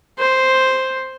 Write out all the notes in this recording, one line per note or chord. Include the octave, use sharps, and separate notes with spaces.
C5